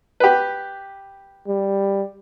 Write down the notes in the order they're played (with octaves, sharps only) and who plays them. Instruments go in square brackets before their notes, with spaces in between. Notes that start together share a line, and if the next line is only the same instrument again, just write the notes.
[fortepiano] G4 B4
[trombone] G3